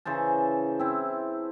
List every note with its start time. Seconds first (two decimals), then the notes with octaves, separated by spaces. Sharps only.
0.05 C#3 E3 C5 A5
0.79 C4 E4